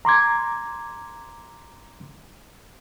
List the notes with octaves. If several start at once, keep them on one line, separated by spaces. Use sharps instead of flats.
A#5 C6 D6 G#6